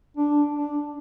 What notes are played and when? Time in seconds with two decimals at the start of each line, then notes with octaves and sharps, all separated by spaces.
0.17 D4
0.53 D4